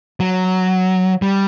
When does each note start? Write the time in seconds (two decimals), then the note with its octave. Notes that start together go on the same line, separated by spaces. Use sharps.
0.20 F#3
1.22 G3